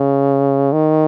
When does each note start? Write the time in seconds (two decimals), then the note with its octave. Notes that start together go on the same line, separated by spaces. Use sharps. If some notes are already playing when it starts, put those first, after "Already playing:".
Already playing: C#3
0.73 D#3